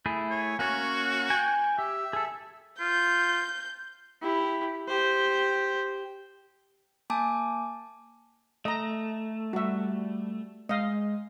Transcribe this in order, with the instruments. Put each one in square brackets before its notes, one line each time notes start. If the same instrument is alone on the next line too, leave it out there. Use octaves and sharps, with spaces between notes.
[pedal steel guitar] A3 E4 G#4
[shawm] C#5
[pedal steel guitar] A#3 C#4 C#5 [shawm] F#4
[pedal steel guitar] G5 G#5
[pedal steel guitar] G4 [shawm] E5
[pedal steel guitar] G#4 A4
[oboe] F4 [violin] G6
[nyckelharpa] E4 G4
G4 C5
[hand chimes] A#3 G#5 A5 D6
[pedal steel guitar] A3 [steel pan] D#5 A#5
[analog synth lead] G3 [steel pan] F#4 E5
[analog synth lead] G#3 [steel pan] D#5 F5